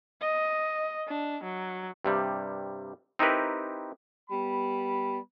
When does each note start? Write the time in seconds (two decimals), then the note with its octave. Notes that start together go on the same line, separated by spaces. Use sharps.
0.21 D#5
1.08 D4
1.43 F#3
2.05 G2 C3 G3
3.19 C4 D#4 E4 G4 A#4 B4
4.30 G3 B3 B5